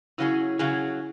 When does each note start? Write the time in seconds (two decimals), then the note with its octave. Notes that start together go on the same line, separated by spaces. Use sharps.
0.18 C#3 F#3 C#4 E4 G#4
0.59 C#3 F#3 C#4 G#4